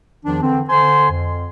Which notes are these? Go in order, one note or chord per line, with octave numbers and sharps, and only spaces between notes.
E2 D#3 F3 D4
D3 E3 C4
D3 C5 G#5 C6
F2